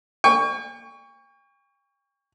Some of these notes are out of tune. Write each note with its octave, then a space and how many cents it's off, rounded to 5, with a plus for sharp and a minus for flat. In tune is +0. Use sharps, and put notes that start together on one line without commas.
G5 +45 C#6 +15